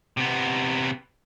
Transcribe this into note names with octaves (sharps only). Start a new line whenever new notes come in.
C3 B3